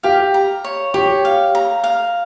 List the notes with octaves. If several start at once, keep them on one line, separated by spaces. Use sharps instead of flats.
G4 F5
A#5
C#5
G4 C#5
F5
A#5
F5